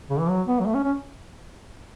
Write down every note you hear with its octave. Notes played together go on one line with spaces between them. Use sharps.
C#3
E3
F#3
B3
F#3
A3
C#4
C#4